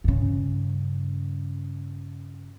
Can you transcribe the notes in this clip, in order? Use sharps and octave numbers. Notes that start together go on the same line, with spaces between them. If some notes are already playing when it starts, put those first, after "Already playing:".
G2 C#3